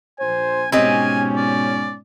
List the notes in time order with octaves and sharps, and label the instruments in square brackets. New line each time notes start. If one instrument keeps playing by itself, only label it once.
[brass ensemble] A#1 C5 [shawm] G#5
[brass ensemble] G#2 B2 C#4 [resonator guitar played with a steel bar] C4 G4 D#5 [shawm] G#5
[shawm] D5